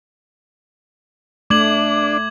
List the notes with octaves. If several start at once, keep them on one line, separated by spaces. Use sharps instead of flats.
A3 D4 D6 G#6 F#7